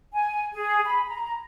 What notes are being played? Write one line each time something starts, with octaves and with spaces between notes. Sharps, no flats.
G#5
G#4
B5
A#5